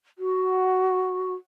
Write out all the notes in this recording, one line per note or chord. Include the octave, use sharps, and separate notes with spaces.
F#4